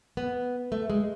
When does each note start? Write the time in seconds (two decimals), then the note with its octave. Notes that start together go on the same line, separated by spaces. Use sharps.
0.17 B3
0.72 A3
0.90 G#3